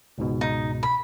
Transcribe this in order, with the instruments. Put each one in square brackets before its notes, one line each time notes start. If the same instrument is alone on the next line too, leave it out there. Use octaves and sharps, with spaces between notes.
[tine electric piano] C#2 G#2 B2
[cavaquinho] D#4
B5